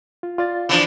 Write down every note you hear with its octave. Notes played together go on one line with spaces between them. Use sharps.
F4
F4 D5 A6
E3 F3 D4